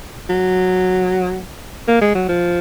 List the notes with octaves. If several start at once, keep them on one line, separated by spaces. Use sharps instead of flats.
F#3
A#3
G#3
F#3
F3